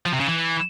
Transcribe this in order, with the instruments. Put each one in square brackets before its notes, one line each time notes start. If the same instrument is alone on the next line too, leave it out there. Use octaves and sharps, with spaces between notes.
[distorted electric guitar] F3
C3
C#3
E3